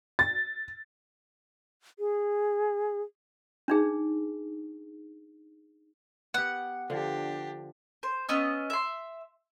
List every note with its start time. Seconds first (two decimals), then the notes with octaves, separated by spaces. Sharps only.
0.19 A6
1.99 G#4
3.68 D4 D#4 G#4
6.34 B3 G4 F#5
6.90 D3 F3 D4 G4
8.03 C5
8.29 B3 C#4 D#5 E6
8.70 E5 C6